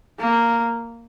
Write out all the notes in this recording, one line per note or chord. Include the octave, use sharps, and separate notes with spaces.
A#3